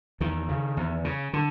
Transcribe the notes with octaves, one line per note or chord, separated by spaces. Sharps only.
E2 D#3
C#3
E2
C#3
D3